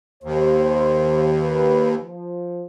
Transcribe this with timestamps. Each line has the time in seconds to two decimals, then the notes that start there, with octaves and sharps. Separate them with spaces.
0.24 D#2 C5
1.42 B4
2.00 F3